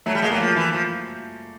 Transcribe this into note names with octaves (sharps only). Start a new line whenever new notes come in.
F#3 A3
G3
G#3 A#3
F#3 A3
F3 A#3
E3
F3